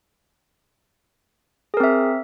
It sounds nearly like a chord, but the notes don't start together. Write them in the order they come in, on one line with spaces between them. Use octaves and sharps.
G#4 A#4 C4 E5